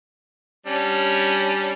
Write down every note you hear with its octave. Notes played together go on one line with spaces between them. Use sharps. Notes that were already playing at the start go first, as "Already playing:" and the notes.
G3 C#4 D4